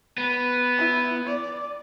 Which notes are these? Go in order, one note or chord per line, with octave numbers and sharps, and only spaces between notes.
B3 B4
E4
D5